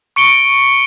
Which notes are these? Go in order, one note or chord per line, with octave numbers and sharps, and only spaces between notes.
C#6 C#7 D7 G7